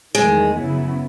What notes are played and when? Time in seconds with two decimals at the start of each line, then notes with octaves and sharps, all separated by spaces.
0.15 E2 D#3 F#3 G#3 A3
0.53 F#2 C#3 F#3 B3 E4